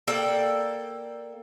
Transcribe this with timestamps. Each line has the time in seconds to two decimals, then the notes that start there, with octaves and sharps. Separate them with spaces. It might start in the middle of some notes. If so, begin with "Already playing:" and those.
0.07 A#3 A4 D5 G5